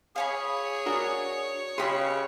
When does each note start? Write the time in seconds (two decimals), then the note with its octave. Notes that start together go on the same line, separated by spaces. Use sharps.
0.16 G#4 C#5 F5 G#5 B5
0.86 D4 F#4 A#4
1.78 C#3 G4 G#4 B5 C6